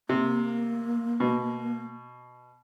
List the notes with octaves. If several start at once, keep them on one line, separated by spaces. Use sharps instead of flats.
C3 A#3
B2